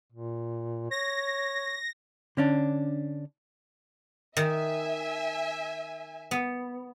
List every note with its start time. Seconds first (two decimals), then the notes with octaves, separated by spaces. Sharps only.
0.12 A#2
0.91 C#5 A#6
2.37 D3 C#4 D4
4.37 D#3 E5 G#5
6.31 B3